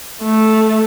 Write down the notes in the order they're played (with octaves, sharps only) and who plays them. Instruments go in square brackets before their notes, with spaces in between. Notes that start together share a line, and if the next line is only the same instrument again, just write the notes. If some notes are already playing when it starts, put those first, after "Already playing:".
[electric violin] A3